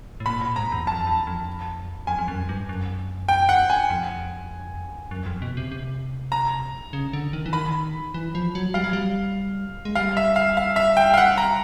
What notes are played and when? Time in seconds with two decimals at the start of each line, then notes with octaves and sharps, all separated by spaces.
0.20 A2
0.26 A#2 B5
0.41 A#2
0.56 G#2 A#5
0.72 E2
0.87 F2 A5
1.07 E2
1.27 F2
2.07 F2 G#5
2.18 F2
2.28 F#2
2.49 G2
2.69 F#2
3.29 G5
3.49 F#5
3.70 G#5
3.90 F2
5.11 F#2
5.26 F2
5.42 B2
5.57 C3
5.72 C3
6.32 A#5
6.93 C#3
7.13 D3
7.33 D#3
7.46 E3
7.53 D#3 B5
8.14 E3
8.35 F3
8.55 F#3
8.74 G3 F5
8.84 F#3
8.93 G3
9.85 G#3
9.95 G3 F5
10.17 E5
10.36 F5
10.57 F5
10.76 E5
10.97 G5
11.14 F5
11.17 F#5
11.38 A#5